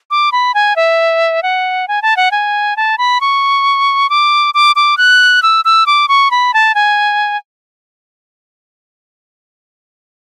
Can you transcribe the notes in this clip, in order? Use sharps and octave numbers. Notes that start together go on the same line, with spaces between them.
D6
B5
G#5
E5
F#5
G#5
A5
F#5
G#5
A5
B5
C#6
D6
D6
D6
F#6
E6
E6
D6
C#6
B5
A5
G#5